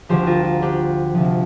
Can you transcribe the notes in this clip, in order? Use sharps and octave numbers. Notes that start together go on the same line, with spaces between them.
D2 D3 F3 G4 C5
F4 A#4
F4
D4 G4
D2 C3 F3